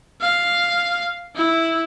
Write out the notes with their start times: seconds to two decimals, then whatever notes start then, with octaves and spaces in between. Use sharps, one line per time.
0.22 F5
1.36 E4